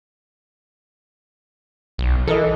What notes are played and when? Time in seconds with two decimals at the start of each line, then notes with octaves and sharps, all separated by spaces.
1.98 B1
2.28 E3 A4 A#4 D#5